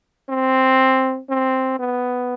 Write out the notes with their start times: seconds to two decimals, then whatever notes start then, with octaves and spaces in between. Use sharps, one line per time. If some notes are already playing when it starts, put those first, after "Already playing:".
0.29 C4
1.30 C4
1.80 B3